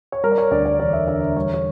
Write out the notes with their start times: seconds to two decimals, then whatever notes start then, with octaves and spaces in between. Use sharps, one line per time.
0.12 C#5
0.23 G3 A#4
0.32 D5
0.38 C#5
0.51 D2 D5
0.66 D5
0.79 E1 D5
0.93 E5
1.08 D3 E5
1.21 D5
1.36 G3 C#5
1.54 C#5